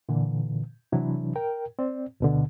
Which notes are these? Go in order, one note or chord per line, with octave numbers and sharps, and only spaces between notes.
A#2 D3 E3
C3 E3 F#3 D4 E4
A#4 G5
C4 D5
D2 B2 D3